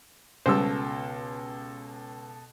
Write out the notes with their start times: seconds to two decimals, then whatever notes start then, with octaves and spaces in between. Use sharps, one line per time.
0.46 C#2 B2 G3 A4 C5 E6